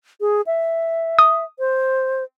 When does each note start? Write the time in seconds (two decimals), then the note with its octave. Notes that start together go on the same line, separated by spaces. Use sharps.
0.21 G#4
0.47 E5
1.19 D#6
1.59 C5